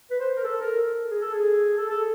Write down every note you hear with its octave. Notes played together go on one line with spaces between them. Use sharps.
B4
C5
A#4
A4
A#4
G#4
A4
G#4
A4
A4